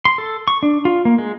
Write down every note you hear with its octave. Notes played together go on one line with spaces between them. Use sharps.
C6
A4
C#6
D4
F4
A#3
G#3